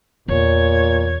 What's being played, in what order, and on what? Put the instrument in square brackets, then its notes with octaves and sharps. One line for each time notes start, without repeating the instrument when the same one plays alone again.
[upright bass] E2 [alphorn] A#2 [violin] C#5 G#6